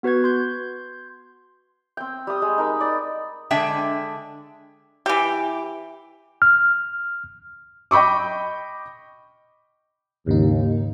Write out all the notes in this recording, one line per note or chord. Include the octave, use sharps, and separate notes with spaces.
B3 F#4 B4 G6 G#6
C6 G6
C4 G5
G3 D#6
G#3
D#4 A#4 B5
D5 D#6
D3 G#3 D4 E5 G5
E3 G4
F6
D#5 G5 B5 C#6 D6
D#2 G#2 C#3 D#4